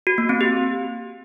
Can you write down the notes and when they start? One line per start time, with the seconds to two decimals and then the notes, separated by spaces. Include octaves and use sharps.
0.07 F#4
0.18 A#3
0.29 C4
0.41 G4